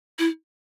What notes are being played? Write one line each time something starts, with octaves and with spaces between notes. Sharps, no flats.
E4